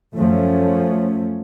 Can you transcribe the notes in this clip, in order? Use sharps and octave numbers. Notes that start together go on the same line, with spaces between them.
F#2 F3 A3 C#4